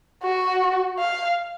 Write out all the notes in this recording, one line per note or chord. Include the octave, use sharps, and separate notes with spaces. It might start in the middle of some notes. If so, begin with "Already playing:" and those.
F#4
F5